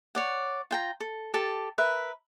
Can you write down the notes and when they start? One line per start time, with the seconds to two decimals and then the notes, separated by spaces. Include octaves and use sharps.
0.15 C#5 D5 F#5
0.71 F4 G5 A#5
1.00 A4
1.34 G4 A4 A5
1.78 A#4 B4 E5